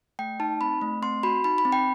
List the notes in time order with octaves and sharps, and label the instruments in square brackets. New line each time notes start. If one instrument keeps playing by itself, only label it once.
[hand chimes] A3 G5
D#4 A5
C4 B5
A3
C4 C6
F#4 B5
D#4 B5
B5
C4
G5